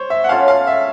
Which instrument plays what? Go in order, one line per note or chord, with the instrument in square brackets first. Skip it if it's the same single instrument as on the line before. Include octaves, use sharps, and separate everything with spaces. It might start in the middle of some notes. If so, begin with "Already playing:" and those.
Already playing: [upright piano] C5 C#5
E5
F#5
[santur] C#4 F4 A4 C#5 [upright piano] F5
[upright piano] F5
E5